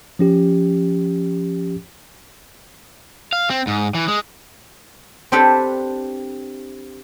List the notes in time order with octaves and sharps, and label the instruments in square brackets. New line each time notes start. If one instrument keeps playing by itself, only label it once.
[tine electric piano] F3 C#4 G4
[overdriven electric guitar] F5
C4
G#2
E3
G#3
[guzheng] C4 D4 G4 A4 B4